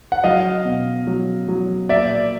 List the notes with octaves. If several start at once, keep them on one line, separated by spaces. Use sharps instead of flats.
F#5
F#3 D#5 F5
B2
F#3
F#3
A#2 D5 E5